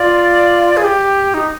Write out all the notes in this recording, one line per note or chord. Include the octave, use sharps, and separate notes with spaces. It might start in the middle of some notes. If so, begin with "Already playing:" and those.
Already playing: F4 D5
G#4
G4
D#4